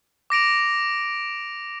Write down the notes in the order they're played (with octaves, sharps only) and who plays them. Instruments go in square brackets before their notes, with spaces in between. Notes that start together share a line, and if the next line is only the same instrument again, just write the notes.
[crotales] D6 A#6 D7 F7